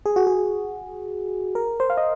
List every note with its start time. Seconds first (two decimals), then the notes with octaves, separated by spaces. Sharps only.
0.06 G#4
0.16 F#4
0.27 G#4
1.55 A#4
1.80 C5
1.90 F5
1.97 D#5